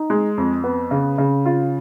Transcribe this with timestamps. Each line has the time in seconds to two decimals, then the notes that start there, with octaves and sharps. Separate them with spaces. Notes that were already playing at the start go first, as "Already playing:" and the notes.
Already playing: D#4
0.10 G#3
0.38 F2
0.64 B3
0.91 C#3
1.18 C#3
1.46 F4